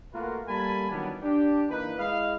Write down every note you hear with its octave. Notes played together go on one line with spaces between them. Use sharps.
A3 A#3 F4 F#4 A#4 B4
G3 A3 A#3 G#5 A5 B5
D#3 E3 F#3 G3 B3 D4
D4 G4
E3 A#3 D#4 B4
G#3 E4 D#5 F5